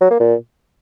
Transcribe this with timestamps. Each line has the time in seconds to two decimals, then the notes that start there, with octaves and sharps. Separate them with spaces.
0.01 F#3
0.11 A#3
0.20 A#2